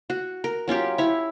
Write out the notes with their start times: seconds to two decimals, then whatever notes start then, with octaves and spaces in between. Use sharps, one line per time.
0.10 F#4
0.44 A#4
0.68 F#3 C#4 F4 G4
0.98 E4 C#5